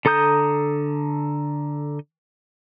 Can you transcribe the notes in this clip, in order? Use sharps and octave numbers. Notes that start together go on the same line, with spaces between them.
D3 A4 A#5 D#6 G6